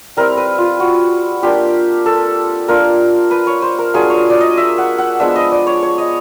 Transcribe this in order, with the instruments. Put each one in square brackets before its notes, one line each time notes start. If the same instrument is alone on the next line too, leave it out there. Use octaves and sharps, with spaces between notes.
[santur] G3 C4 E4 A#4
B4
F4
F#4
A#3 D4 F4 G4
A4
A#3 D4 F4 A#4
B4
C#5
C5
A#4
F#3 A#3 D4 F4 G#4
C#5
D5
D#5
E5
F#5
F#5
F3 G#3 B3 D4 E5
D#5
D5
C#5
C#5
D#5